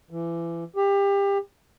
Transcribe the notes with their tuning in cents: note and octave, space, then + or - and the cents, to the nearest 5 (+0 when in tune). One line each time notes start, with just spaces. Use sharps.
E3 +30
G4 +25